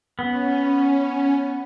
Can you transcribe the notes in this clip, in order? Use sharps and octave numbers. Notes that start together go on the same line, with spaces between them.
B3 C#4